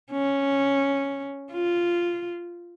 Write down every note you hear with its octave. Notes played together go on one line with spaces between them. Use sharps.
C#4
F4